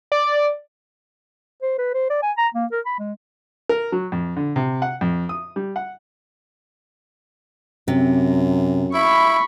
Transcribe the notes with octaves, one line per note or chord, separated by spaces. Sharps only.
D5
C5
B4
C5
D5
G#5
A#5
A#3
A#4
B5
G#3
A#4
F#3
F2
D3
C3
F#5
F2
D#6
G3
F#5
F#2 C3
E4 B5 C#6